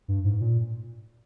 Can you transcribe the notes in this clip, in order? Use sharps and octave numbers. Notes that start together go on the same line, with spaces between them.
G2
G#2
A#2